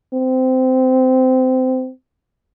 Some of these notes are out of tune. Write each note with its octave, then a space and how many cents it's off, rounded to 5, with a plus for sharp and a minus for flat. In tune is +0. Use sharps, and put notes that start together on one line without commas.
C4 -20